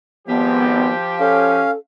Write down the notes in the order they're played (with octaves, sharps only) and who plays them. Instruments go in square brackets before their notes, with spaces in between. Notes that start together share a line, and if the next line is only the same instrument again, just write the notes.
[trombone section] G#1 [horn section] F3 G4 [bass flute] B3
[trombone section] C#4 [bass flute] A4 [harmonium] F5